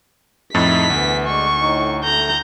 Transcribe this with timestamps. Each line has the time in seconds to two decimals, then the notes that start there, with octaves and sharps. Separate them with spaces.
0.54 F2 A2 D#4 E4 A6 B6
0.90 D2 E3 B3
1.26 G#3 D4 C#6
1.59 A2 D#4
2.04 A3 A#5 G6